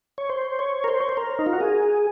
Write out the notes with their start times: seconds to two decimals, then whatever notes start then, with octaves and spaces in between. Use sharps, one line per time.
0.18 C#5
0.29 C5
0.59 C#5
0.84 A#4
0.88 C5
1.00 C#5
1.09 C5
1.17 A#4
1.39 D#4
1.46 F4
1.53 F#4
1.61 G#4